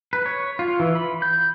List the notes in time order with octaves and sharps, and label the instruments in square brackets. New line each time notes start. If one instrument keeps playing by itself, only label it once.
[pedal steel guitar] B4
C#5
F4
E3
B5
G6